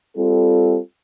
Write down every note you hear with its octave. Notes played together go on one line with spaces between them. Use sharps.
G3 C4 F4 A4